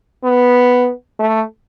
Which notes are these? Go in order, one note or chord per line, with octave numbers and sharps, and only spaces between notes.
B3
A3